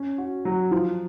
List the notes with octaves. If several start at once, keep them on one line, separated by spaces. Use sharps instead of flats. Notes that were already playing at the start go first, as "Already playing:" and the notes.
Already playing: C#4
F#4
F#3
F3